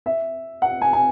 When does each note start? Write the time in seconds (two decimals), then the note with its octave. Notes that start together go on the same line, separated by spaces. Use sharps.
0.06 E5
0.62 F#5
0.81 G#5
0.93 G#5